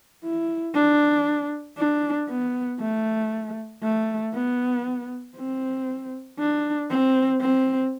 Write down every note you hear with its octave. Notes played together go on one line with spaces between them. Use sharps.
E4
D4
D4
B3
A3
A3
B3
C4
D4
C4
C4